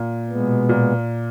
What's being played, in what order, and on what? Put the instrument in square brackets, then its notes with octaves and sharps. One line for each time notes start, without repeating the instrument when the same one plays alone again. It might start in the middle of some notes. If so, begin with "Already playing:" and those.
Already playing: [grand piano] A#2
[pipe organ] B2 G#3 B3
[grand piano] A#2